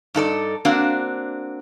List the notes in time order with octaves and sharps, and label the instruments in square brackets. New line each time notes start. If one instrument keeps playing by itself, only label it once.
[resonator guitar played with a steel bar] G2 D#4 A4 D5
A#3 C4 D4 F#4 F5